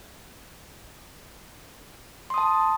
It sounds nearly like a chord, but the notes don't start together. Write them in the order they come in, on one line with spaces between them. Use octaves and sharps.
C6 D#6 A5